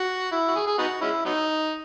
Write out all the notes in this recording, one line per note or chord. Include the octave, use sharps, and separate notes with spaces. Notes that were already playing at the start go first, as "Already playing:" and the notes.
Already playing: F#4
E4
F#4
G#4
G#4
B3 D#4 F#4
G#3 C#4 E4
F#3 B3 D#4